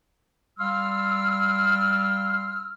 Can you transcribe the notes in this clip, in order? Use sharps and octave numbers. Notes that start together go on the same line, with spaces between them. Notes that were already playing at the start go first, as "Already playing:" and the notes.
G3 F5 C6 E6 F6